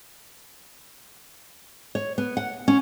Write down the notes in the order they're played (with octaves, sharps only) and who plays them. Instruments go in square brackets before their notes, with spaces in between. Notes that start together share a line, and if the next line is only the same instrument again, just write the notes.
[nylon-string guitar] C#5
B3
F#5
C#4